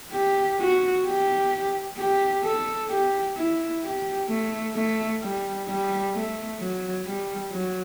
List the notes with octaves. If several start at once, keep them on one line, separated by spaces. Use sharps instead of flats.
G4
F#4
G4
G4
A4
G4
E4
G4
A3
A3
G3
G3
A3
F#3
G3
F#3